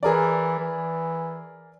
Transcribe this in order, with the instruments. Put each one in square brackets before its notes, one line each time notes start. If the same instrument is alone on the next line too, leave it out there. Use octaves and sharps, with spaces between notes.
[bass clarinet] E3 [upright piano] G#4 A#4 D5
[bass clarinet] E3